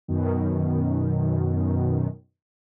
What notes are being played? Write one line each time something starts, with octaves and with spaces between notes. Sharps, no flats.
F#2 B2 D#3